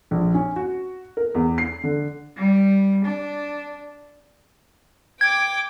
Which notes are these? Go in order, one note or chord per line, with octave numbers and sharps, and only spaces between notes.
A#1
C#4
F#4
A#4
E2
C7
D3
G3
D4
G5 D6 G#6